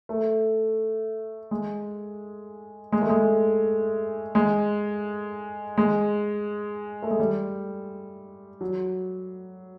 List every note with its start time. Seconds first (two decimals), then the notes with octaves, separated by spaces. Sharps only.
0.09 A3
1.51 G#3
2.92 G#3
3.02 A3
3.09 G#3
4.35 G#3
5.77 G#3
7.02 A3
7.11 G#3
7.20 G3
8.61 F#3